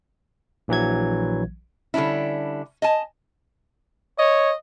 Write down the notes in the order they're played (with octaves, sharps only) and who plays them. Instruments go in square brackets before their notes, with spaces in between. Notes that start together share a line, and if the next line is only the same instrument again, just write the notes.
[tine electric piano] A#1 E3 F#3 G#6
[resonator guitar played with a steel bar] D3 G3 C#4 D4 E4
D#5 G#5 A5
[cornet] C#5 [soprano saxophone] D#5